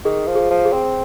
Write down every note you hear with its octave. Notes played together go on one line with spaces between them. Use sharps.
D#3 G#4
F3
G#4
F3
G#4
C4